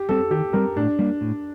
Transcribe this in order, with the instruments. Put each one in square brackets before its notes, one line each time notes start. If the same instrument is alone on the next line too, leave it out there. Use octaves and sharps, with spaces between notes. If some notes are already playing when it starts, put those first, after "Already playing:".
Already playing: [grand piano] G4
[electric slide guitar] G3 C4 [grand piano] A4
[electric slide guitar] D#3 [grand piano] G4
[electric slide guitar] G3 C4 [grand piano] A#4
[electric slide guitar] A2 [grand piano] D4
[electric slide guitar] G3 A#3
A2